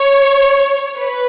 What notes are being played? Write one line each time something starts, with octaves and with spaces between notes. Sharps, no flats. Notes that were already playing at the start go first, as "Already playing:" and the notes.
Already playing: C#5
B4